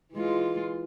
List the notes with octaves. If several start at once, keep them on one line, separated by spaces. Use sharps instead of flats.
E3 G#3 F4